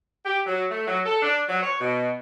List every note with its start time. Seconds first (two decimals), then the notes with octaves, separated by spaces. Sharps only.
0.25 G4
0.46 F#3
0.71 A3
0.88 F#3
1.05 A4
1.22 D4
1.49 F#3
1.62 C#5
1.81 B2